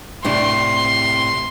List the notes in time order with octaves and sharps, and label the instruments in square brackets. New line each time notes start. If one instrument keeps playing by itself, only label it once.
[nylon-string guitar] A2 C3 D4 [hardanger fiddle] C6